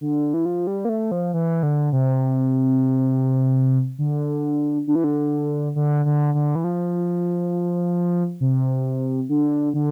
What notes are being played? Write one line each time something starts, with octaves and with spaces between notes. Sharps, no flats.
D3
E3
F3
G3
A#3
A3
F3
E3
D3
C3
D3
D3
E3
D3
D3
D3
D3
E3
F3
C3
D3
D3